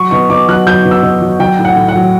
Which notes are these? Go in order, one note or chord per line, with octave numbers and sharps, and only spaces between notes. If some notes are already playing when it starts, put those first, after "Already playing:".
Already playing: F#3 C#6
B2 C#6
B2 D6
F#3 F#6
F#3 G6
B2
E6
B2
F#3
F#3 G5
A2
F#5
A2
F#5
F#3